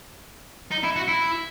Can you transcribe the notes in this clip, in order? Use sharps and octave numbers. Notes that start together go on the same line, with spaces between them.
D#4
E4
F#4
E4